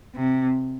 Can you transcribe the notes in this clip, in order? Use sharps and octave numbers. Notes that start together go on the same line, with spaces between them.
C3